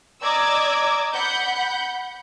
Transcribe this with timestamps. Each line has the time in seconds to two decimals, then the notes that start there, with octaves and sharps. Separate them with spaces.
0.22 D5 D#5 A#5 D6 E6 G#6
1.13 F#5 B5 G6